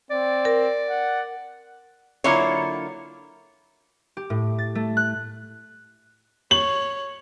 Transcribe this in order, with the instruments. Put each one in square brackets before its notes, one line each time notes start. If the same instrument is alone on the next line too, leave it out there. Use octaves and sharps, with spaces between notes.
[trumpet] C4 [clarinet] D5
[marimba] A#4
[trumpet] F#5
[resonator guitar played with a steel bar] D3 F#3 A#3 E4 F4 C#5
[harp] G4
A2
A6
A3
F#6
[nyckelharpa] C#5 [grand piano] F#7